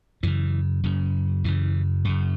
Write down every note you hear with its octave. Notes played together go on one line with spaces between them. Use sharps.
F#2 C#3 E3
F#2 C#3
F#2 C#3 E3
F#2 C#3